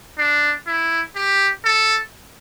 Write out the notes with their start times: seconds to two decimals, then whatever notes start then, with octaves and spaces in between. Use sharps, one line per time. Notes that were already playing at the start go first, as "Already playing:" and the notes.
0.18 D4
0.67 E4
1.15 G4
1.65 A4